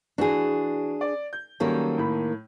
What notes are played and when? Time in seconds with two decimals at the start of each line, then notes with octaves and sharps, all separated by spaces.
0.18 E3 D4 F#4 G#4
1.01 D5
1.33 G6
1.60 D#3 F#3 G3 A#3 C#4 A4
1.98 A2 B5